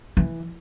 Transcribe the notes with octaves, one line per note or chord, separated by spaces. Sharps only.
E3